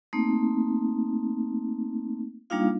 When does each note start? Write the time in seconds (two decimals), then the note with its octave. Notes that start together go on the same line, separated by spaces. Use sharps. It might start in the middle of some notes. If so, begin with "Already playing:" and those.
0.13 A3 A#3 C4 D#4
2.50 G3 A#3 D4 D#4 F4 F5